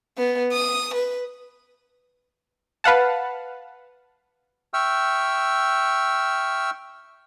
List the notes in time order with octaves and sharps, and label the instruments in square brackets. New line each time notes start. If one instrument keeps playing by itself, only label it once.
[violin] B3
D#6
B4
[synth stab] B4 F5 F#5 A5
[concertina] E5 G5 C#6 E6 F6